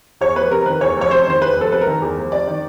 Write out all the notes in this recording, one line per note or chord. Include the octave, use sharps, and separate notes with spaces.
E2 C#5
F1 B4
C3 A#4
D#3 B4
E2 C#5
F1 C#5
C3 C5
D#3 C5
E2 B4
F1
A4
C3 B4
A#4
D#3
E2
F1
C3 D5
D#3